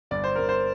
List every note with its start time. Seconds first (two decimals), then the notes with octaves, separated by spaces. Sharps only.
0.11 G1 D5
0.24 C5
0.36 G1 A#4
0.49 C5